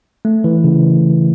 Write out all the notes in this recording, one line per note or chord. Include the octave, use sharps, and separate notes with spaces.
A3
E3
C#3